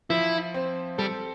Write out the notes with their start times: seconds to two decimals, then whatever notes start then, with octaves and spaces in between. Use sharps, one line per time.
0.10 F3 E4
0.54 C4
0.98 G3 A4